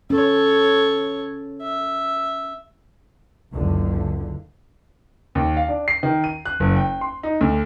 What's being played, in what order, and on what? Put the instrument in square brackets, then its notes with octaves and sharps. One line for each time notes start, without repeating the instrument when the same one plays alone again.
[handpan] C#4 [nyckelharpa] A4 C#5
[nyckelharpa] E5
[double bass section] F#1 C#2 D3
[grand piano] D#2
F5
D4
C7
D#3
D#7
F#6
F#1
G5
C6
D#4
D2